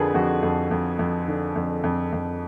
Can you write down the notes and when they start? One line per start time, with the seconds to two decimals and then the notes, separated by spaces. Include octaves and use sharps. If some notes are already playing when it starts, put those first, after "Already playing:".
Already playing: F2 D3 F3 G#4 A#4 B4
0.14 F2 F#4
0.43 F2
0.71 F2
0.99 F2
1.28 D3
1.56 F2
1.84 F2
2.13 F2